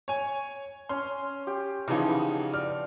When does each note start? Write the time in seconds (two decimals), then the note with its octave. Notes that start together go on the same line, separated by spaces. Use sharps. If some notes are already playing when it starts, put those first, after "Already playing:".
0.08 C#5 G#5
0.89 C#4 C6
1.47 G4
1.88 C#3 E3 F3 B3 D#4 D6
2.54 D5 F6